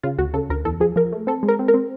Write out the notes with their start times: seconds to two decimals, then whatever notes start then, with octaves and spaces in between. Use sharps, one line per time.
0.03 C#3 F4
0.18 D2 F#4
0.34 C#3 A4
0.50 D2 A#4
0.65 E2 A4
0.80 F3 G#4
0.96 F3 A#4
1.13 A3
1.27 C4 A4
1.43 G#3
1.48 A#4
1.59 C4
1.68 A#4
1.74 C4